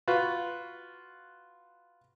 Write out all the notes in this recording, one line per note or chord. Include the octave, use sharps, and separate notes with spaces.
F4 F#4 B4